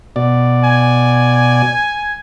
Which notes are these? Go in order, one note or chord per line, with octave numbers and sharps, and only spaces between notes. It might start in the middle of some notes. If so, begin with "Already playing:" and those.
B2 D5
G#5